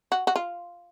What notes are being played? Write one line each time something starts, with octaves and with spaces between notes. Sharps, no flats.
F#4
F#4
F4